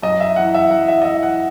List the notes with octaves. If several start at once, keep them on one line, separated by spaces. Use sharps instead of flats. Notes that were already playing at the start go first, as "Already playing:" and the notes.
F#2 D#5
E5
E3 F#5
E5
F#2 F#5
E5
D#5
E3 E5
F#5